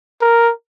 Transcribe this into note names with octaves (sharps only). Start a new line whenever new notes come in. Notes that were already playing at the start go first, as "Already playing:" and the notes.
A#4